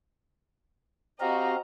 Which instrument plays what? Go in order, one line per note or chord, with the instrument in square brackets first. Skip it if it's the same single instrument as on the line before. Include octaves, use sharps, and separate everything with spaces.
[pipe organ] C4 G4 F5 [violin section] F#4 D#5 A#5